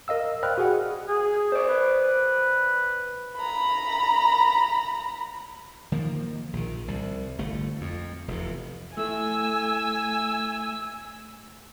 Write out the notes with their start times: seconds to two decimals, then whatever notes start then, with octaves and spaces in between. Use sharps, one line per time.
0.08 A#4 D#5 F5 E6
0.43 C5 D5 G5 B5 F6 F#6
0.58 F#4 G#4 F#5
1.07 G#4
1.52 C5 D5
1.68 B4
3.36 A#5 B5
5.92 D#3 F3 A#3
6.53 A#1 D#3
6.88 C2
7.38 G1 A3
7.81 F2
8.28 F1 E2 C3
8.97 A2 A3 G#5 E6